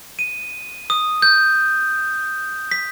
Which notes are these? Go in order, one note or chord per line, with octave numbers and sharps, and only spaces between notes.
D#7
D#6
G6
B6